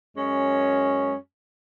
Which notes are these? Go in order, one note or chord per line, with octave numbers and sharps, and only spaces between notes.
F#2 G#3 C#4